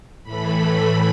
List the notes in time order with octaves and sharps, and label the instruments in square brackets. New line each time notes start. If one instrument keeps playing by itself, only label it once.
[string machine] A2 E3 A3 B5